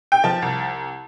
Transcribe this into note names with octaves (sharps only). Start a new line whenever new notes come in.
G5
F3 A5
C2